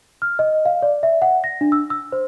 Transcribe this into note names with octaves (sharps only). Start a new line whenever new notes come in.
F6
D#5
F5
D5
E5
F#5
A#6
D4
E6
E6
C5